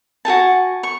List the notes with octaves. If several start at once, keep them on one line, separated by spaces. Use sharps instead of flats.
F#4 G#4 G#5 A5
C#6